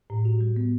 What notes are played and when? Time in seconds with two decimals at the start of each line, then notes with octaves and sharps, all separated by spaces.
0.10 A2
0.25 F#4
0.41 G3
0.56 B3